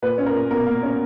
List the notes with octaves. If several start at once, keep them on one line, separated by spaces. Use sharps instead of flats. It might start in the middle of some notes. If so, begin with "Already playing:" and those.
A#2 B4
C#4
A#4
A#2
B2 A#4
A#3
C#4